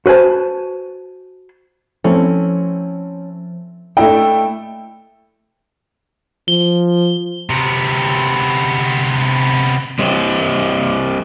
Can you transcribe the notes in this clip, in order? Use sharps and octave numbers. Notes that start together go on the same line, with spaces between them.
F#4 B4 C5 G#5 A5
F3 A3 C4 C#4 E4
A3 D4 E4 D#5 G5
F3 G7
C3 B3
G3 C4 G4 C5 C#5 D#5